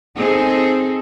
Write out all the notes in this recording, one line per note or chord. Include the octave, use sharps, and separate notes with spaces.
C4 D#4 G#4 A4